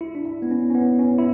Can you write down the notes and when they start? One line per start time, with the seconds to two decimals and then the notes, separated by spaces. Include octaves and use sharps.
0.01 E4
0.15 D4
0.25 E4
0.42 B3
0.51 C#4
0.70 C#4
0.75 B3
0.99 C#4
1.18 E4